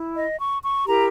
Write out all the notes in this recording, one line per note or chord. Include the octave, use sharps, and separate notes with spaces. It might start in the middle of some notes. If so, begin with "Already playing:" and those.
Already playing: E4
D#5
C#6
C#6
E4 G4 A#4 A#5